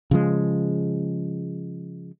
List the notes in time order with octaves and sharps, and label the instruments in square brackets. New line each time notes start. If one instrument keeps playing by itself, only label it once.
[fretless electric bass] C#3 F3 G#3